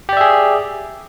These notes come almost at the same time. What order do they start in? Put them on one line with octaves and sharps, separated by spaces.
G4 D5 E5 G#4